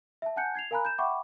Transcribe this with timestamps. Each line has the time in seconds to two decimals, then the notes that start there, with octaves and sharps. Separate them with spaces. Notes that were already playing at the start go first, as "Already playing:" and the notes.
0.22 E5 A5
0.36 F#5 G#5 A5 F#6 G6 C#7
0.55 G#6 C7 F7
0.71 A#4 F5 G#5 A#5 B5 F#6
0.85 G6 E7
0.98 E5 F#5 G5 B5 C#6 D6